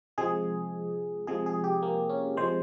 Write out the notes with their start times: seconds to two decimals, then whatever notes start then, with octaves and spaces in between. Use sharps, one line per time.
0.18 C3 F3 G#3 G#4
1.27 C3 F3 G#3 G#4
1.46 G#4
1.64 G4
1.82 A#3
2.09 C#4
2.37 C3 F3 G#3 C5